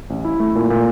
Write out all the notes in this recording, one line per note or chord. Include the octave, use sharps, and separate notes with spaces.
A1
E4
A3
A#2
A#2